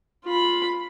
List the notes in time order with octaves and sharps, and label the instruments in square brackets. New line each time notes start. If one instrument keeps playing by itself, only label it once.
[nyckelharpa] F4 B5